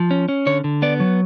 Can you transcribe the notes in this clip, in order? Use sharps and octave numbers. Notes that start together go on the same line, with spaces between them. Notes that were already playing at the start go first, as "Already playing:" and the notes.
Already playing: F3
C#4
C#4
D3 C#5
D3
B3 D5
F#3